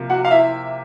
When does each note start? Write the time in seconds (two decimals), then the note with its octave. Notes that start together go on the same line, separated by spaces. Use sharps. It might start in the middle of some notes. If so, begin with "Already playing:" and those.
Already playing: C3 F3 A#3
0.10 F#4 F#5
0.25 F5
0.31 E4 E5